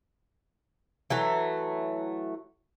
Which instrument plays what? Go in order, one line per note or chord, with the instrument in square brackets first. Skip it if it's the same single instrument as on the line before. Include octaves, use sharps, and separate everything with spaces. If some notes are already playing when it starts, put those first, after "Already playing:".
[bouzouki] E3 F#3 A3